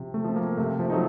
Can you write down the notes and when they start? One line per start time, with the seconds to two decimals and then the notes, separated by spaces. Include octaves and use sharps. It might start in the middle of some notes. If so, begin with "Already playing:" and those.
Already playing: C3 F3 C4
0.14 A3
0.24 F3 C4
0.36 A#3
0.57 C3 A3
0.79 F3
0.90 F#3 A3 D#4